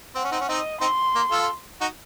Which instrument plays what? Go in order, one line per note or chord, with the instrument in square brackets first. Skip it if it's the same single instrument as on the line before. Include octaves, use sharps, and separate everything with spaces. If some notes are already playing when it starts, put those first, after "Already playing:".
[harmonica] C4 [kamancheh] F#5
[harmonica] C#4
C4 D#4
C#4
[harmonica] C4 D#4 [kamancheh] D#5
[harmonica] C4 D#4 [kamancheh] C6
[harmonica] A#3
F4 A4
D#4 F#4